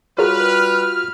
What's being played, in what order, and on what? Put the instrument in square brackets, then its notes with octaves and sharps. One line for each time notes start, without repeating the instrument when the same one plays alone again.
[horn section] G3 B4 [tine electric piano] F4 F#4 [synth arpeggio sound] G#4 A#4 C#5 [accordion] F6